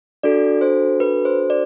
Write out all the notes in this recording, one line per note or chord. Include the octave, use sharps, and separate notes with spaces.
D4 F#4 A4 D5
C5
B4
C5
D5